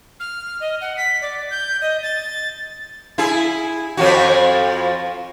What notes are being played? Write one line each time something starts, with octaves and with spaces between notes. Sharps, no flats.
F6
D#5
F#5
B6
D5
G6
D#5
A6
E4 G#4
F2 F3 F#4